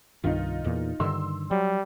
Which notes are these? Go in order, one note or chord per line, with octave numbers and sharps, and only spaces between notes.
C2 G2 D#3 D#4 F4
E2 A#2
G2 D3 D#3 C6 E6
F#3 G3